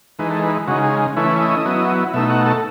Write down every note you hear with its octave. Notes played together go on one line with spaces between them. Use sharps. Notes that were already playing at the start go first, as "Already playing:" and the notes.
E3 G#3 D#4 B4
A4
B4
C#3 G#3 D#4 F#4
G#4
E3 A3 C#4 E4 B4
D#5
F#3 B3 E4
B2 A3 D#4 E5
F#5
A4